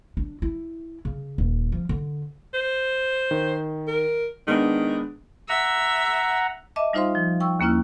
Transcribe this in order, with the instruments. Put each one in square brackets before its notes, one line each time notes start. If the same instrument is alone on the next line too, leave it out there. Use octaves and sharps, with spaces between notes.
[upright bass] D4
E4
C#3
D#1
F3
D3
[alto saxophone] C5
[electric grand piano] D#3
[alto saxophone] A#4
[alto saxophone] D#3 [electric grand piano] G#3 B3 D4
[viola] E5 [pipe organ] F#5 A#5
[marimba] D#5 E5 A5 D6
G3 D#4 F4 C5 F5 C6
F3
G5 C#6 E6
D#2 A#3 C#4 E4 F6